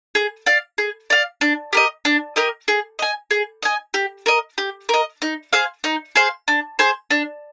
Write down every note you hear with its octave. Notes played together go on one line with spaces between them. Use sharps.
G#4
D5 F5
G#4
D5 F5
D4
G4 A#4 D#5
D4
G4 A#4 D#5
G#4
D#5 G#5
G#4
D#5 G#5
G4
A#4 D#5
G4
A#4 D#5
D#4
G#4 C5 F5
D#4
G#4 C5 F5
D4
G#4 C5
D4